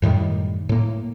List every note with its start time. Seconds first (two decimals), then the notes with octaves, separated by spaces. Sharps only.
0.02 F#2 A2 D#3 G3
0.69 A2 A#3